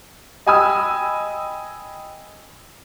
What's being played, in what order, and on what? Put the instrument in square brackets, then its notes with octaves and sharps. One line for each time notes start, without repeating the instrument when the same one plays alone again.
[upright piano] D#5 G5 G#5 B5 D#6 E6